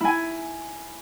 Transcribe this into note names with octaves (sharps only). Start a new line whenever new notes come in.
E4 G#5